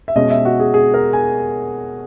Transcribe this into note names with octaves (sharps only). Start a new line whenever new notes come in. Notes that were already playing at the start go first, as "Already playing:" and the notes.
E5
B2 G#3 C#4 D#5
E5
F#4
G#4
G#4
A#4
G#5